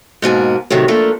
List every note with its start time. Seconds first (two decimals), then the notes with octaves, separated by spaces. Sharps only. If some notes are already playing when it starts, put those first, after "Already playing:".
0.22 G#2 B2 A#3 G#5
0.70 A2 C3 D#3 F#3
0.88 F3 A3 A#3 D4